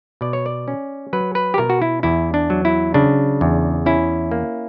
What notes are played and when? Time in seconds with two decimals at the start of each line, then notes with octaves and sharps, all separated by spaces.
0.21 B2 D5
0.33 C#5
0.46 D5
0.68 C#4
1.13 F#3 B4
1.35 B4
1.54 G4
1.58 B2 A#4
1.70 F#4
1.82 E4
2.03 E2 E4
2.34 D4
2.50 F#3
2.65 E4
2.94 C#3 D4
3.41 E2
3.86 C#4 E4
4.31 A#3